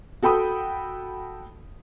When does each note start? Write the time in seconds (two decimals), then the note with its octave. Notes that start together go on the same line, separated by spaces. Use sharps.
0.23 F#4 A4 G5 B5 D#6